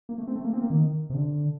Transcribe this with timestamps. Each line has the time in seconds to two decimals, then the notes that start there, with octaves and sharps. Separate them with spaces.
0.09 A#3
0.18 A3
0.27 C4
0.36 A3
0.45 A#3
0.53 C4
0.62 A#3
0.70 D#3
1.10 C3
1.14 D3